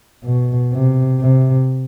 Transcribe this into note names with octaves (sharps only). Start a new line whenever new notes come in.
B2
C3
C3